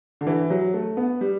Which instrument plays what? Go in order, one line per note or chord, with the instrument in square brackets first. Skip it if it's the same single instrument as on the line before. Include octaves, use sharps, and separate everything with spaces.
[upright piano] D3
E3
F#3
A3
B3
G3